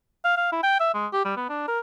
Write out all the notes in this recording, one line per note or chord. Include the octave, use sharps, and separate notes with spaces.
F5
F5
E4
G5
E5
G#3
G4
G3
B3
D4
A#4